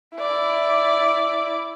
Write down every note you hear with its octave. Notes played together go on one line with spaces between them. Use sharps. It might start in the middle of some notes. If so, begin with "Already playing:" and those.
E4 D5